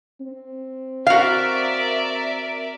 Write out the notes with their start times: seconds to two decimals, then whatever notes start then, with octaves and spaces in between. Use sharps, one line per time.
0.20 C4
1.07 F#4 A#4 D5 E5 F5